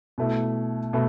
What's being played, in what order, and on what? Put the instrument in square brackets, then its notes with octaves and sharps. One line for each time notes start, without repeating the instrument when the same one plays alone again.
[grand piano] B2 A3 E4
B2 A3